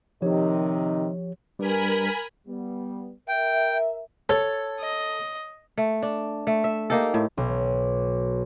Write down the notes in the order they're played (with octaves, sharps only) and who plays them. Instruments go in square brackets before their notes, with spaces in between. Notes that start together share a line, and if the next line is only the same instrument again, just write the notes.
[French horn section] C3 D#3 D#4 [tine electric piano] F3 G4 C#5
[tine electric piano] G3 D4 B4 [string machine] A#4 G#5 B5
[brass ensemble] G3 B3
[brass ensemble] A#4 E5 [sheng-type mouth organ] G5
[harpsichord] A4 [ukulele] C#5
[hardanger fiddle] D#5
[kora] A3
D4
A3
E5
A#3 D#4 G4 A4
A2
[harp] B1